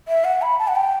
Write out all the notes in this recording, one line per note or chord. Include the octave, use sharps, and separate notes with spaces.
E5
F#5
B5
A5
F#5
G5